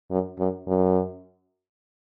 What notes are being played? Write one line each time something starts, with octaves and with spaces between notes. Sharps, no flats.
F#2
F#2
F#2